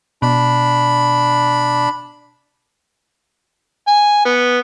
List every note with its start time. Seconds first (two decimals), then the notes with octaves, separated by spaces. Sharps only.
0.22 B2 D4 B5
3.88 G#5
4.25 B3